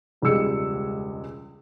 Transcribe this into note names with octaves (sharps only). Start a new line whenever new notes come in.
E1 C#2 G3 G#3 E6 C#7